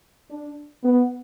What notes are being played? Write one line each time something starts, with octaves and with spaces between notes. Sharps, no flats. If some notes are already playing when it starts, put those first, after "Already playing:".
D4
B3